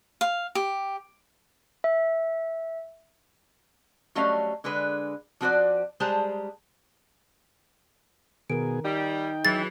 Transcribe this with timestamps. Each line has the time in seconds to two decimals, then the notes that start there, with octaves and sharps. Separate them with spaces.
0.21 F5
0.55 G4
1.84 E5
4.15 F#3 G3 A3 C#4 D#5 F5
4.64 D3 G#3 G#4 B4
5.41 F3 C4 F#4 A4 C5 D5
6.00 G3 G#3 G#4 C5 A5 A#5
8.50 B2 D#3 G#4 A#4 D7
8.84 G3 D#4 G5
9.45 E3 F#3 G#4 A6